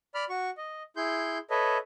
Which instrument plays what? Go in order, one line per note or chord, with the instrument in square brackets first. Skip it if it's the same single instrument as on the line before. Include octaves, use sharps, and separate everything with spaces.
[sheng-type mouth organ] D5 B5 F6
F#4 C#6
D#5
E4 G#4 C6 G6
A4 B4 C#5 D#5 E5